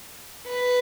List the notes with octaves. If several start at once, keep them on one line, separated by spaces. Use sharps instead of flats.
B4